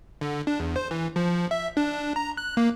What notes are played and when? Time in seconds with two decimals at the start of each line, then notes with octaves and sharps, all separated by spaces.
0.21 D3
0.47 D4
0.60 E2
0.76 C5
0.91 E3
1.16 F3
1.51 E5
1.77 D4
2.16 A#5
2.37 F#6
2.57 A#3